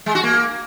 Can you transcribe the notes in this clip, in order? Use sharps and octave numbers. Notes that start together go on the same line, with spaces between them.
G#3
F#4
A#3